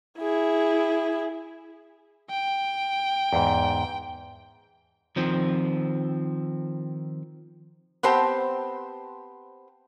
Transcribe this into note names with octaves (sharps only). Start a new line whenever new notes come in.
E4 G#4
G5
E2 G#2
D#3 F3 C4
B3 C4 G4 C5 A5